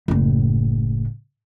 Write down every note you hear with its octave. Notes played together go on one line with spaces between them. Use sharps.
F#1 A2